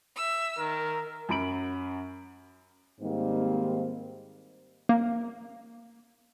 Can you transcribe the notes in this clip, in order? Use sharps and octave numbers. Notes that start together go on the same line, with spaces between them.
E5 E6
D#3 A#4
F#2 F#3 B5 D7 F#7
G#2 D#3 G3 A#3 C4
A#3